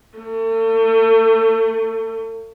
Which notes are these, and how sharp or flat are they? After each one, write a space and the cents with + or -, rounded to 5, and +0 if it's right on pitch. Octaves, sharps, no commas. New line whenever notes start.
A3 +35